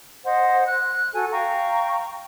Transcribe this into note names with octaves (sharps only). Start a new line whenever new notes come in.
C5 D#5 F#5
F#6
F#4 A4 G#5
F5 G5 A#5 C#6